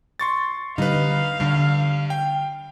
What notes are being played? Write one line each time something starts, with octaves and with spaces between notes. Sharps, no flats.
C6 C#6 A6
D3 G3 D#4 B4 F5
G2 D3 G3
G5